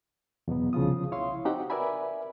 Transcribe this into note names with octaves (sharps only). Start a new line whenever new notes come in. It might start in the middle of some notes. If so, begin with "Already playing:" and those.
E2 B2 F#3 B3
C2 C#3 F3 F4 D#6
E4 C#5 F5 C6
C4 D#4 F#4 G4 F#5 G5
A#4 B4 D5 E5 G#5 B5